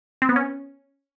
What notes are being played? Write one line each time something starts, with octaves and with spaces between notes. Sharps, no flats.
C4
B3
C#4